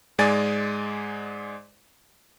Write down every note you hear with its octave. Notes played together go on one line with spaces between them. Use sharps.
G#2 G#3 D5 G#5 A6